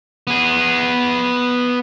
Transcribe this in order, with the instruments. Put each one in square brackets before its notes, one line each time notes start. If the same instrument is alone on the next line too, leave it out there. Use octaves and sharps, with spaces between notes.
[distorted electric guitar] B3 G#4